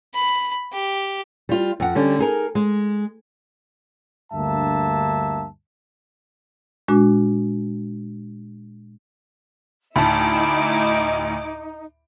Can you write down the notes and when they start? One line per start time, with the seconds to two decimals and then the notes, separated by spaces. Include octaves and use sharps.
0.14 B5
0.73 G4
1.49 G3 F4
1.80 F2 F#5
1.95 D3 G3 C#4
2.19 D#4 G#4 A#4
2.55 G#3
4.33 D2 G2 A#3 E5 A5
6.88 A#2 G#3 D4 F#4
9.96 D2 A2 D#4 E4 A5 B5 D6